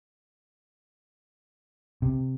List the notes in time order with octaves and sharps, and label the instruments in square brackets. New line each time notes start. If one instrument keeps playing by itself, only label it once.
[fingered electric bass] C3